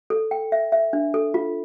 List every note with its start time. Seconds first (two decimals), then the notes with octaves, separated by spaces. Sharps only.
0.10 A4
0.31 G5
0.52 E5
0.72 E5
0.93 D4
1.14 A4
1.34 F4